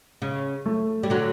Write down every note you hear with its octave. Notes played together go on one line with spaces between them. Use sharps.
C#3
A3
G3
D3 F#3